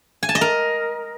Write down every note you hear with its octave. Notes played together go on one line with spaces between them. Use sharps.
G#5
A5
D#5
A#4